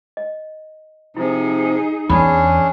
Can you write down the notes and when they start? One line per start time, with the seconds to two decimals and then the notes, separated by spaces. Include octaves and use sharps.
0.17 D#5
1.17 C3 F3 D#4 E4 G#4
2.09 E2 C#4 D4 G#4 B5